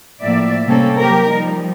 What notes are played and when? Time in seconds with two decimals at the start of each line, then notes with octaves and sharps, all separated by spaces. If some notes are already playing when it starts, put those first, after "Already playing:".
0.22 A2 F3 A#3 D5 E5
0.66 C3 G3 A#3 C4 C#4 A4
0.99 F#3 A#3 G4 A#4
1.30 F3 G3 D#4